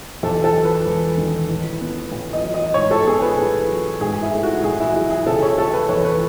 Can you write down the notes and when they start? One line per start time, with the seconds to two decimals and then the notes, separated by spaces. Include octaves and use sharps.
0.23 E2 A4
0.44 A4
0.55 F#3
0.65 B4
0.86 E1
1.18 D#3
1.49 A2
1.81 B3
2.12 A1
2.33 D#5
2.43 F#3
2.54 D#5
2.74 G#2 C#5
2.91 A4
3.06 B3 G#4
3.22 B4
3.38 A1
3.69 F#3
4.01 G#2 G#4
4.22 E4
4.33 A3
4.43 F#4
4.64 A1 G#4
4.80 E4
4.95 F#3 E4
5.11 G#4
5.27 C#3 A4
5.43 C#5
5.58 A3 A4
5.74 B4
5.89 E2 C#5
6.05 B4